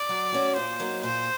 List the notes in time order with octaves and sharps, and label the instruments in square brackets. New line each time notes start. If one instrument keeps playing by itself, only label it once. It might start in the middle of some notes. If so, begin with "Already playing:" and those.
Already playing: [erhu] D5
[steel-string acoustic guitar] F#3
A3 C#4 F#4
[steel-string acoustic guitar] A#2 [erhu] C5
[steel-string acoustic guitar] F#3 A#3 D#4
[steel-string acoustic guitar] A#2 [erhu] C5